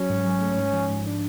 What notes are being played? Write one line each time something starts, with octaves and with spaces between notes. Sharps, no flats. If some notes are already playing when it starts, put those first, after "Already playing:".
Already playing: F#3 C#4
G#2
F#3
A3
G#2
F3
G#2
D4